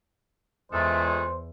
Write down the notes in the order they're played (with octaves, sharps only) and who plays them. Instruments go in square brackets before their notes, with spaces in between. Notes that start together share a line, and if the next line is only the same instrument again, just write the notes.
[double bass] E2 [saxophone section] A#2 A3 [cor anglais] G#3 [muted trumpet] C5